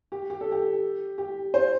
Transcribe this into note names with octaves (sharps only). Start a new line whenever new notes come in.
G4
G4
A4
G4
G4
C5